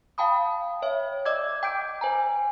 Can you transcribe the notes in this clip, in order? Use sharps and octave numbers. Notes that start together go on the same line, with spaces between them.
F5 G5 A5 B5 D#6
C#5 E5
D5 D#5 D6 E6 G#6
G5 D6 G6 D7
C5 G#5 A#5